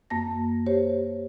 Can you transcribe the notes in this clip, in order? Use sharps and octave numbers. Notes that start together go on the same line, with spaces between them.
F#2 A#3 A5 A#6
G4 C5 C#5